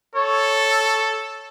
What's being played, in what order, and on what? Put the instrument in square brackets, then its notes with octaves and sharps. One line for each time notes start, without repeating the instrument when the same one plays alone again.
[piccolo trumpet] A4 [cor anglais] C#5